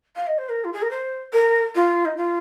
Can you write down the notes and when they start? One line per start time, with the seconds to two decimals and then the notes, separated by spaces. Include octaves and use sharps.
0.16 F5
0.27 D#5
0.38 C5
0.49 A#4
0.64 F4
0.73 G#4
0.82 A#4
0.91 C5
1.33 A#4
1.75 F4
2.05 D#4
2.17 F4